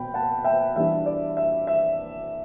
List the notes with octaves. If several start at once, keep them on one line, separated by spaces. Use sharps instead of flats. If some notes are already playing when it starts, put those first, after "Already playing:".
Already playing: B2 G5 B5
F#5 A5
E5 G5
E3 G3 D4 E5
D5
E5
E5